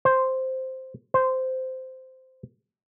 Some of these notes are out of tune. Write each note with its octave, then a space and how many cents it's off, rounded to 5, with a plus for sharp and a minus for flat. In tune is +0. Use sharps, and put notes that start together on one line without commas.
C5 +0
C5 -10